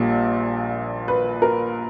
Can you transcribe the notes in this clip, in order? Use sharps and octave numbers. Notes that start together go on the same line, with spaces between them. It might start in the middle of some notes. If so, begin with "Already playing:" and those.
Already playing: A#1 A#2 G3
B4
A#4